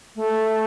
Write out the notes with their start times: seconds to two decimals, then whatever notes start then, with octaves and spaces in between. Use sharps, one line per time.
0.16 A3